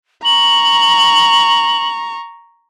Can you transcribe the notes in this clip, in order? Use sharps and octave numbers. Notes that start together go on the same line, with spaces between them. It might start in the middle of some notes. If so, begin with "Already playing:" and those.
A#5 C#6 F#7